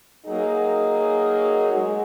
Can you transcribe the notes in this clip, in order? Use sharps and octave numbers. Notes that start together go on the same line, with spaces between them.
F#3 A#3 D#4 G#4
G#3 F#4